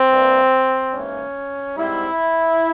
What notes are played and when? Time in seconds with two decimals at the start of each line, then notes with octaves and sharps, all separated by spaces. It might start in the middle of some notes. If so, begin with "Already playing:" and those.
Already playing: C4
0.10 G2 E3 G3 A#3
0.93 G#2 E3 A#3 C#4
1.76 G#2 G3 C4 E4